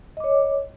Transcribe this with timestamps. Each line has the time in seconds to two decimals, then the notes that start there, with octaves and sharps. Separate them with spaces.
0.17 D#5
0.20 D6
0.24 C#5